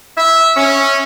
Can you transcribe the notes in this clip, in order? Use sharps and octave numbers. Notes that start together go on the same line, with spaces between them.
E5
C#4